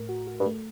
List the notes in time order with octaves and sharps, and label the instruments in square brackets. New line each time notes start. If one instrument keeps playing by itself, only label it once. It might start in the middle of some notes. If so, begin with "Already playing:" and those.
Already playing: [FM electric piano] A2 A3 A#4
F#4
F#4
[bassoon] G2
[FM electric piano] A3